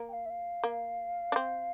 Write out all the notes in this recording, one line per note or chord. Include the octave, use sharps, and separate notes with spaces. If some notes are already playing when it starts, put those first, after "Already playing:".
Already playing: A#3
G5
F5
E5
F5
A#3
D4
C4